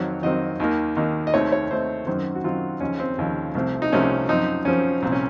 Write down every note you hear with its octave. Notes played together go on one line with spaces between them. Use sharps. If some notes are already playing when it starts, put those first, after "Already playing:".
Already playing: F2 D#3 F#3 C4 C#5
F2 D#3 F#3 C4 D#5
D#2 D#3 A#3
D#2 D#3 A#3
D#5
D#2 D#3 A3 C4 C#5
C#5
D#2 D#3 A3 C4 C5
F#2 D#3 F#3 C4 C5
F#4
F#2 D#3 F#3 C4 F4
D#2 C#3 F3 C#4
C4
D#2 C#3 F3
C2 C3 F3 A3 C4
D#4
C2 C3 F3 A3 C4 C#4
F#2 F3 C4 D#4
F#2 F3 C4 C#4
C2 A#2 F3 C4
C#4